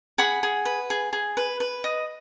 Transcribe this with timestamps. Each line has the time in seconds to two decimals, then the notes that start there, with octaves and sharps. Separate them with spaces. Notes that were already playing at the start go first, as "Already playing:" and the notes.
0.18 G#4 F#5 B5
0.43 G#4
0.65 B4
0.90 G#4
1.13 G#4
1.37 B4
1.60 B4
1.84 D#5